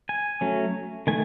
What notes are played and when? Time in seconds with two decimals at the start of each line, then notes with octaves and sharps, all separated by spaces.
0.09 G#5
0.41 F#3 A3 C#4
1.07 D#3 A3 G#5